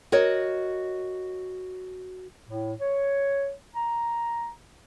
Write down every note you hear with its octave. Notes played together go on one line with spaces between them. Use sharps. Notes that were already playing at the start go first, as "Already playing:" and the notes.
F#4 A#4 C#5 D#5
A2
C#5
A#5